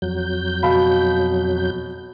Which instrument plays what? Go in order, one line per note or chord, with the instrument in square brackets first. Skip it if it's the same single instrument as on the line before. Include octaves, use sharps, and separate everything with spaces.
[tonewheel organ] F2 F#3 G6
[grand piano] B2 F5 B5